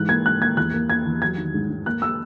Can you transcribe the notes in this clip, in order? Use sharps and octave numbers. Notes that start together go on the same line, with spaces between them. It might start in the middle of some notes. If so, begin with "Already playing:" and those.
Already playing: G#2 E3 F#6
A#3 G#6
G#2 F#6
A#3 G#6
E2 F#6
A#3
A#3 G#6
E2
F#3 G#6
D#3
G#2
G#2
A#3 F#6
A#3 E6